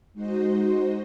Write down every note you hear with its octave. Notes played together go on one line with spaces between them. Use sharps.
G#3 D#4 F#4 C5 D#5